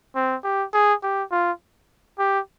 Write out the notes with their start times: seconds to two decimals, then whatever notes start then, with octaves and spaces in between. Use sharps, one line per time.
0.16 C4
0.44 G4
0.74 G#4
1.03 G4
1.32 F4
2.19 G4